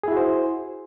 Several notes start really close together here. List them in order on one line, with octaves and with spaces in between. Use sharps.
G#4 E4 F#4 C5